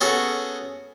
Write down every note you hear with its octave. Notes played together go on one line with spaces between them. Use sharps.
B3 C#4 F#4 G#4 A4